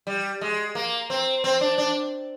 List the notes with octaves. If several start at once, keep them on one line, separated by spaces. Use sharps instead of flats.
G3
G#3
A#3
C4
C4
D4
D4